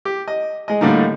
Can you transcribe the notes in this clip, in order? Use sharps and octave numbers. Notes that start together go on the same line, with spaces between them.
G4
D#5
G#3 D#5
A2 D3 G3 A3 A#3 D#4